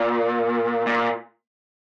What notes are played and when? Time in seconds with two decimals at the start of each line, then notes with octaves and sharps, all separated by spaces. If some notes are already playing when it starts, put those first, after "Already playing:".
Already playing: A#2
0.87 A#2